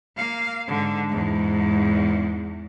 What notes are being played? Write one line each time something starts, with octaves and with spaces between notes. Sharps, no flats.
A#3 F5
G#2 D3
E2 G#2